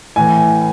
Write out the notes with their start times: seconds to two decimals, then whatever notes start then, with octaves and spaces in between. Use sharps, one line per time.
0.16 A2 E3 G#5